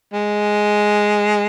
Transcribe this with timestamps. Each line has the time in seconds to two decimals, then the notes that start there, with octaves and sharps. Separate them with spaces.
0.13 G#3